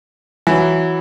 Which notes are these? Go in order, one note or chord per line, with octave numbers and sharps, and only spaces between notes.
E3 F#3 G#5